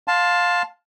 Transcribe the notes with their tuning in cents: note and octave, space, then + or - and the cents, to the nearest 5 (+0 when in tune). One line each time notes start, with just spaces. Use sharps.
F5 +20 A5 +0 C6 +0